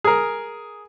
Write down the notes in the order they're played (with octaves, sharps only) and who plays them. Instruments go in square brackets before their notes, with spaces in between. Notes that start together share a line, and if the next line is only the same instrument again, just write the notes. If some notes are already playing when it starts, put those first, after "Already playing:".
[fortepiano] G#4 A#4